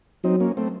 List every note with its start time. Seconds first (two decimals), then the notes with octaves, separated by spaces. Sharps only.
0.24 F#3 C4 D#4
0.40 A#3 C#4
0.57 A3 C4